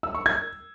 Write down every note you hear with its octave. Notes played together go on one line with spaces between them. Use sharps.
E6
C#6
G#6